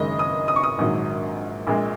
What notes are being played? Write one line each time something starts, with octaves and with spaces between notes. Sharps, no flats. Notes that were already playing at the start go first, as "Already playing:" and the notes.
Already playing: F#1 F#2 D#3 G#3 D#5
D#6
D#6
C#6
D#6
A#1 G#2 D#3 F#3
A#1 A#2 G#3